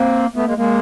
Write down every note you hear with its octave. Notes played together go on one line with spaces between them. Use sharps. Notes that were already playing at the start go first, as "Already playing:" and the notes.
Already playing: A#3 C4
A3 B3
G#3 A#3
G#3 A#3